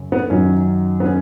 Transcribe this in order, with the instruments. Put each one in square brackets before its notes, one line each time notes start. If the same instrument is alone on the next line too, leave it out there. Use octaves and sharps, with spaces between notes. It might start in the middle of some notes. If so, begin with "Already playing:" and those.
Already playing: [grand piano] F#2 C#3
B3
F#2 D#3 F#3 C#4
B3
C#4